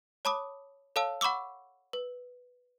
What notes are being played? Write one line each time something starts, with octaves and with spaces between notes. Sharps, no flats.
C#5 A5 B5 D6 D#6
A4 C#5 F5 A5 E6
F#5 B5 C#6 D6 E6
B4